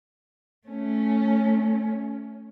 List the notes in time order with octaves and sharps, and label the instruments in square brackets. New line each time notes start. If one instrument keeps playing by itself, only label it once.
[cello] A3 C#4